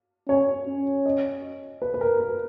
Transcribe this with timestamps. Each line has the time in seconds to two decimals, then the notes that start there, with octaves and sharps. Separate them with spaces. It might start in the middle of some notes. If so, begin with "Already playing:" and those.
0.28 C#4 C#5
0.67 C#4
1.06 D#5
1.82 B4
1.94 B4
2.01 A#4
2.20 A#4